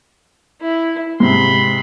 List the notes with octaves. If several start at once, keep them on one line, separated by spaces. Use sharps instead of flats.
E4
G#2 C3 B5 C6